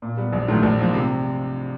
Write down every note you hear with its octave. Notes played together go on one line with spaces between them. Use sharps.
A#2
G3 B3
A#1
G#2 D#3 F#3 A3
A#1
G#2 F3 A#3
C3